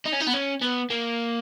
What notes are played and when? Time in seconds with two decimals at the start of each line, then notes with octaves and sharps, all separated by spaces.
0.05 D#4
0.12 C#4
0.20 D#4
0.27 B3
0.33 C#4
0.61 B3
0.90 A#3